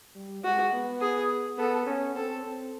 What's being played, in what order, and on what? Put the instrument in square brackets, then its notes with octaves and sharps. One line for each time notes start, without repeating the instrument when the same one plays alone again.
[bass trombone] G3
[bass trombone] G#3 [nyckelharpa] F#4
[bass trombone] B3
[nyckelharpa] G#4
[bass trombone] B3 [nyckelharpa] A4
[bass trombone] C#4
[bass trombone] C4 [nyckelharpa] A4
[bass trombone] C4